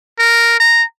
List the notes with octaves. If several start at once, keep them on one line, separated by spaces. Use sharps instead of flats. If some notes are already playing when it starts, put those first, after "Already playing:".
A#4
A#5